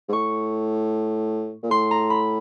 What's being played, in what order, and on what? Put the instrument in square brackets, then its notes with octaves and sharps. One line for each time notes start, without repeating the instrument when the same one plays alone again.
[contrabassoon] G#2
[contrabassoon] A2 [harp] C#6
[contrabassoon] A#2
[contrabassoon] A2 [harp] C6
[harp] A#5
B5